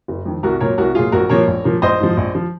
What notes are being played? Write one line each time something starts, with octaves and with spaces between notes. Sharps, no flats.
F#1
F2 D#3
C2 F#4 A#4
A#2 F#3 A#4 C#5
C2 F#4 A#4
A#2 F#3 F4 G#4
A#1 F#4 A#4
A#2 F3 A#3 A#4 C#5
A#1
A#2 F3 A#3
A#1 C5 D#5
G#2 F3
A#1
F3